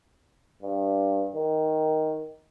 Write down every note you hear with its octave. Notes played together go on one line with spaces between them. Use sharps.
G2
D#3